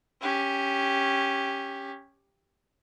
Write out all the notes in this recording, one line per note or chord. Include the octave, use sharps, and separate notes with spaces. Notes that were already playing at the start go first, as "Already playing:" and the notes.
C#4 G4